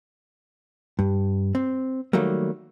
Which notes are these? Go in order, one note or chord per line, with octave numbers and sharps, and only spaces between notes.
G2
C4
D#3 F#3 G3 A3 A#3